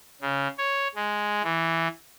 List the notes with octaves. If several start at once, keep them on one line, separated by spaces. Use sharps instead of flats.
C#3
C#5
G#3
E3